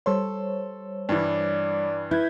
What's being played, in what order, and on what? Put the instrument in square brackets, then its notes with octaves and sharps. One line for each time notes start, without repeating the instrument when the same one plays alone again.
[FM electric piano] G3 C5 C#5 [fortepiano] A4 C6
[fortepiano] G2 E3 [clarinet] D5
[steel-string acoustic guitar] E4 [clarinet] B4 [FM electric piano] G6 G#6